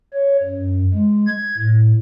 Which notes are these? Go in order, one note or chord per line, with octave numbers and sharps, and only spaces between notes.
C#5
F#2
G#3
G#6
A2